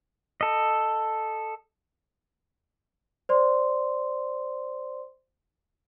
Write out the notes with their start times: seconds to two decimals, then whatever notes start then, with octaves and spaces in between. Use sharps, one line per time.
0.41 A4 D#5
3.29 C5 D5 C6